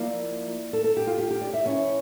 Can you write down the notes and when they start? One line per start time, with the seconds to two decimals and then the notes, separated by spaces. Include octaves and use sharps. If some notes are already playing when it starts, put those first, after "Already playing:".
Already playing: F3 A#3 E4 D5
0.73 A4
0.84 A4
0.97 G4
1.07 F4
1.18 G4
1.30 G4
1.41 D5
1.53 E5
1.65 F3 C#4 E4 C#5